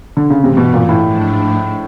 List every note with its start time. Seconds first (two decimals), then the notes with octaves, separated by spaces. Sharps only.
0.17 D3
0.30 C#3
0.41 G2 C3 E3 A3
0.57 B2
0.74 A#2
0.89 A2
1.05 G#2 F3 A3 D4